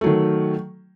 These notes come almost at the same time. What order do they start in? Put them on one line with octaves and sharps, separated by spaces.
A3 F#3 D#3